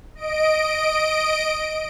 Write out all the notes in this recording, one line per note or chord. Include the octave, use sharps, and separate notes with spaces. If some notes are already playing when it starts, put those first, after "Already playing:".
D#5 D7